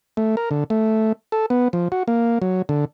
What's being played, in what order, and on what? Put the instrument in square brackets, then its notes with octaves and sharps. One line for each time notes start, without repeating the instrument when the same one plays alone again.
[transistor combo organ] A3
A#4
D3
A3
A4
B3
F3
F#4
A#3
F#3
D3